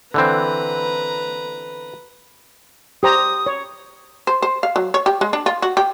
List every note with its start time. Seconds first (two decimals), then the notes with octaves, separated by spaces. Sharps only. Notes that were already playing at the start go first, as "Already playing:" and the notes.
0.14 D3 E3 C4 B4 A#5
3.03 G4 C5 A#5 D#6
3.46 C#5
4.27 C5
4.42 C5
4.63 F5
4.76 F#3
4.94 C#5
5.06 G4
5.21 G#3
5.33 D4
5.46 F4
5.62 F#4
5.77 G4